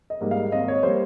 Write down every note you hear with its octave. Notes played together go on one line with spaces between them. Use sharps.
D#5
G#2 G3 A#3
F5
G#1 D#5
C#5
G3 A#3 C5